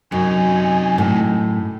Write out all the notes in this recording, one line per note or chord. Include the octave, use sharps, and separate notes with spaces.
F#2 C3 D#4 G#5
A2